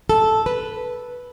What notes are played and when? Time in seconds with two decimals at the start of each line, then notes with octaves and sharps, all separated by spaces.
0.09 A4
0.46 B4